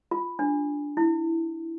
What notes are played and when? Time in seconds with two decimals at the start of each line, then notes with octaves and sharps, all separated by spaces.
0.11 F4
0.39 D4
0.97 E4